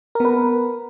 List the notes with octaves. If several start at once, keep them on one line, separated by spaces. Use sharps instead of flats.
B3 A#4 B4